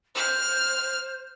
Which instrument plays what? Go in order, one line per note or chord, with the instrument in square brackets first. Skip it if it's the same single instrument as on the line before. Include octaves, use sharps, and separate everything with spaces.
[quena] C5 [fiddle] F6